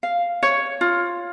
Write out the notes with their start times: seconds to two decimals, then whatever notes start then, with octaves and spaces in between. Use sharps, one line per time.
0.03 F5
0.43 C#5
0.81 F4